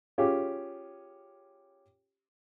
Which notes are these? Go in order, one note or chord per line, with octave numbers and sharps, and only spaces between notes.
C#4 F4 G4 G#4